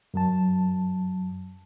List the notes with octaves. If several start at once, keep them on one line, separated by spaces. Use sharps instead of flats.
F#2 F#3 A5